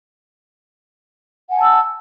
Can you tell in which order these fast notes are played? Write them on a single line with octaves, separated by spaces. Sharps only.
F#5 G#5 A5 E6